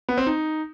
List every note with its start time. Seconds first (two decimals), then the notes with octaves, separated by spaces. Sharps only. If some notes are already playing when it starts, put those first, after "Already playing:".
0.09 B3
0.18 C4
0.27 D#4